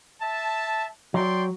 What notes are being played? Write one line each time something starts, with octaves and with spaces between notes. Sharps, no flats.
E5 A5
F#3 D5 G5 C6